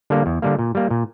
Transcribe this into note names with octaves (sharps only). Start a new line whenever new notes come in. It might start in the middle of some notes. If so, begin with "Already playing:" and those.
D3 G3 A#3
E2
D3 G3 A#3
A#2
G3 A#3
A#2